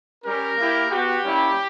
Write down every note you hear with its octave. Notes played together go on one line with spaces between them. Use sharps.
G3 C#4 G4 A#4
A#3 E4 G4
B3 F#4 G4
G3 A#3 C#4 E4